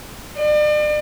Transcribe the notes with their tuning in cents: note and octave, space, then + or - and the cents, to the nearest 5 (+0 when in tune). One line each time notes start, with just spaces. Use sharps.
D5 +40